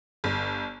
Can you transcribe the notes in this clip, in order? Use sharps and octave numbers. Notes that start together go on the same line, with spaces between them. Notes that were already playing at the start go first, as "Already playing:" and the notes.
G1